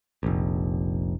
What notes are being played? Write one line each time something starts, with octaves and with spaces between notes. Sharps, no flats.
F1 A#1